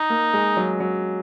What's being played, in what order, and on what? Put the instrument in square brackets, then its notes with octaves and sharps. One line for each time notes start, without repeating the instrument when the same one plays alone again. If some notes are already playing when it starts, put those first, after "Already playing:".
Already playing: [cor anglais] D#4
[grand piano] A#3
G#3
F#3
F#3